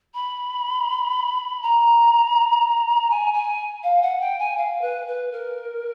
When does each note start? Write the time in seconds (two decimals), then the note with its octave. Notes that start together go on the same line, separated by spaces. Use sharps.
0.14 B5
1.62 A#5
3.10 G#5
3.33 G#5
3.83 F5
4.02 F#5
4.20 G5
4.39 G#5
4.57 F5
4.81 B4
5.07 B4
5.31 A#4